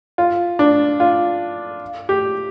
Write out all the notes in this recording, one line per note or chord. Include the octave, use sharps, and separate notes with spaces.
F4
D4
F4
G4